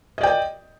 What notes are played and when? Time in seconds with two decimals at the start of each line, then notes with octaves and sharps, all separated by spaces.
0.18 D#5
0.21 D5
0.23 G5